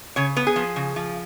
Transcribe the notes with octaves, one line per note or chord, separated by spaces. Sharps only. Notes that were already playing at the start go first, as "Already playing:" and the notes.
C#3 C#5
B3 B4
G#4
F3
C#3
F3